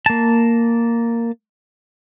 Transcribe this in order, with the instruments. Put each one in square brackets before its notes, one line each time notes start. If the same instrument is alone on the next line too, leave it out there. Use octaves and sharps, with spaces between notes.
[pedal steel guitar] A#3 A5